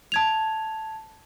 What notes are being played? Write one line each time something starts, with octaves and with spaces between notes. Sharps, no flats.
A5 G#6 F7